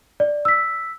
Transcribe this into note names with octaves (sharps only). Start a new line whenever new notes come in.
D5
E6 B6